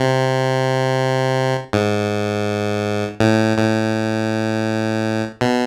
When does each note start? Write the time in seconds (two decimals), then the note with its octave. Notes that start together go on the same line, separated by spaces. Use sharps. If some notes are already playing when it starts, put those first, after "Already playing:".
Already playing: C3
1.73 G#2
3.20 A2
3.58 A2
5.41 B2